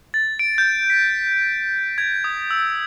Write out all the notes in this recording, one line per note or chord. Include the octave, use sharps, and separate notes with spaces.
A6
D7
G6
B6
G#6
D#6
E6